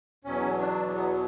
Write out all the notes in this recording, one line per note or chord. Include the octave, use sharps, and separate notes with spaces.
E2 B2 F#3 C#4
D4
B3